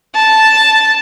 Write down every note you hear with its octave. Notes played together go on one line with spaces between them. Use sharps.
A5